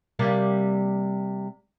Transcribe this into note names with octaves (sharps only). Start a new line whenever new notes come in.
C3 G3 A#3